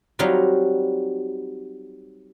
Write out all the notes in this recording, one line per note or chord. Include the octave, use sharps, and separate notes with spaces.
F#3 G3 C4 D#4 F4 F#4